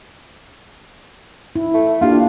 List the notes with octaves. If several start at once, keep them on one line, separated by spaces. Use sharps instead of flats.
E4
A3
A#3 D4 F4 G4